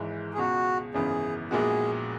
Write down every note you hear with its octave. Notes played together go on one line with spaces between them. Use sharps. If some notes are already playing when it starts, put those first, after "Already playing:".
Already playing: G#1 G#2 E3 G#3
G#4
C#2 B2 G#3 F#4
G#1 F#2 C#3 E3 B3 G#4
A#1 A#2 G#3 B3 F#4 G#4